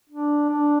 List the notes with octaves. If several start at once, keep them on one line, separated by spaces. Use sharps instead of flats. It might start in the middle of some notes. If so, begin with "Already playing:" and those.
D4
D4